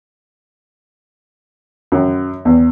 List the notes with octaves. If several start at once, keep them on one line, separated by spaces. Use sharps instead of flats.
F#2
E2